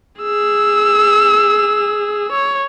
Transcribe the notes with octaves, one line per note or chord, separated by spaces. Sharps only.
G#4 E6
C#5